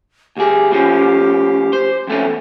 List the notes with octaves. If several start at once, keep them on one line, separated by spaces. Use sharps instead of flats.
D2 G4 G#4
A2 F3 C#4
C5
F2 A3 C#4
E2